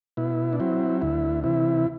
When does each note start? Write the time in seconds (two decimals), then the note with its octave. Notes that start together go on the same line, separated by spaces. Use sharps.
0.17 B2 E4
0.53 D4
0.60 F#3 C4 E4
1.01 D2 E4
1.44 C3 E3 E4